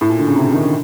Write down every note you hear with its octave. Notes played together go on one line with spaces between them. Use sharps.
A2
A#2
D3
C#3
C3
C#3
D#3
D3